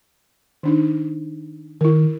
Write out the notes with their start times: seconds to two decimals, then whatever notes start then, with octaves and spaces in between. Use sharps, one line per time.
0.63 D#3 D4 D#4
1.81 D#3 E4 A#4